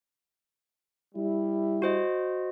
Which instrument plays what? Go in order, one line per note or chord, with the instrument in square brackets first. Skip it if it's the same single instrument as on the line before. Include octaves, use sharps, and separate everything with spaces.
[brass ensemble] G3 E4
[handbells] F#4 C5 D#5